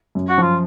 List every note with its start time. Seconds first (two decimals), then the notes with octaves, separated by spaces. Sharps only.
0.15 F#2
0.29 F#4
0.38 F3 F4